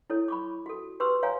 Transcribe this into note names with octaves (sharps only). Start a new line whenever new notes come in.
E4 A4 C#5
B5 C#6 D6
F#4 A4
G4 B4 C6 E6
C#5 F5 G#5 A#5